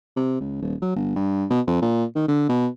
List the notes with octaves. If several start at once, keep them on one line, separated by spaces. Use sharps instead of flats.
C3
C#2
D#1
F#3
G1
G2
B2
F2
A#2
D#3
D3
B2